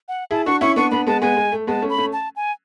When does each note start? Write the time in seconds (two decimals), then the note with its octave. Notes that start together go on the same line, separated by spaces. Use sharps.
0.08 F#5
0.31 E4 G#4 A5
0.46 D4 F#4 C#6
0.61 C#4 E4 C#6
0.76 B3 D4 C#6
0.91 B3 D4 B5
1.07 G#3 B3 A5
1.21 G#3 B3 G#5
1.37 G#3
1.52 A3
1.67 G#3 B3 A5
1.82 A3 C#4
1.90 B5
1.98 A3 C#4
2.13 A5
2.36 G#5